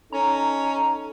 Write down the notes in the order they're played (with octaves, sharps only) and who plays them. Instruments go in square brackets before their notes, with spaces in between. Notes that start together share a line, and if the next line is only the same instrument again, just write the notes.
[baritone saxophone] C#4 [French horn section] D#4 A4 [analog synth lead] A#5